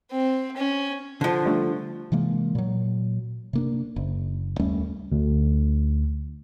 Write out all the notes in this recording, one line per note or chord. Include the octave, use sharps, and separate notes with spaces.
C4
C#4
D3 F3
G3 A3 D4
C3 E3 G#3 A#3
A#2 F#3
C3 A#3 D4
F#1
D#2 G3 A3 C#4
D2